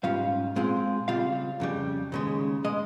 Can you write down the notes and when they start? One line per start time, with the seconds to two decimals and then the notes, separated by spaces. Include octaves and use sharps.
0.04 G#2 G3 C#4 F4 F5
0.56 A#2 G#3 C4 F4
1.08 C#3 G3 C4 F4 F5
1.60 F2 C#3 G3
2.12 D#2 C#3 G#3
2.64 A#2 G#3 D#5